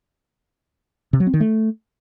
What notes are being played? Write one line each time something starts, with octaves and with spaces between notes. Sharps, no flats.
C3
F#3
C4
D#3
A3